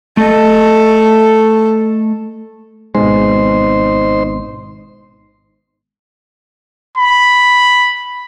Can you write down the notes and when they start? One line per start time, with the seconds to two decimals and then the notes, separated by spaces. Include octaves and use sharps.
0.17 A3 A4 D#5
2.95 G#1 B2 G#3 D#4 C5 C6
6.98 B5